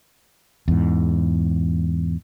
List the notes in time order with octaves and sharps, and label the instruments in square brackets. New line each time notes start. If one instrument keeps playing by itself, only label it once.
[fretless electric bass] E2 G#2